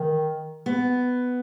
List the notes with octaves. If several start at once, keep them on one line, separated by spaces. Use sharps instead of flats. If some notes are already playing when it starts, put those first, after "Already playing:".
Already playing: D#3
B3